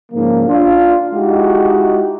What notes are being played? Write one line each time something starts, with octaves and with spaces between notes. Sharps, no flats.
G#2 C#3 F3 A#3
D4 F4
G#3 D#4 E4 F#4 G4